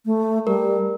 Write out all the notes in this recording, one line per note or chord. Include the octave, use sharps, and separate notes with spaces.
A3
G3 A#4